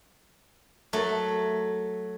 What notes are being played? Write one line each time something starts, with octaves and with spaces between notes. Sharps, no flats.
F#3 A3